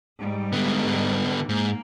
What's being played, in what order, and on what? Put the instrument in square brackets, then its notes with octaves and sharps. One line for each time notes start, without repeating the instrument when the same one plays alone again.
[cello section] G#2 G3
[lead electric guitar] D3 B3
[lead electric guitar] G#2 [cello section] A#3